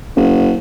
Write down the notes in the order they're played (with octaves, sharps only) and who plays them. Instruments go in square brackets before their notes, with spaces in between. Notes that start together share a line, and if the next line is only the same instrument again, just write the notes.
[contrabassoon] F#1